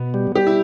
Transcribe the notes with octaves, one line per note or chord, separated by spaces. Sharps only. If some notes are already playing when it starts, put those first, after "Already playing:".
Already playing: B2 B3
G3
G3 G4
E4